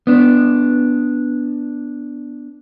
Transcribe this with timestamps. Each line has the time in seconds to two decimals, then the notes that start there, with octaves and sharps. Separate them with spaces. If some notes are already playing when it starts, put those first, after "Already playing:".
0.07 B3 D4